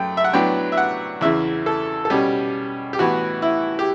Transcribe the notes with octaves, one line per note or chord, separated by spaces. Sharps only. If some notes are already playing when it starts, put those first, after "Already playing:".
Already playing: F#2 A3 G5
E5
F#5
A2 F#3 B3 D4 G5
E5
F#5
E2 C#3 E3 E5
A4
A4
B2 G3 C#4 G4
G4
A2 E3 B3 F#4
E4
G4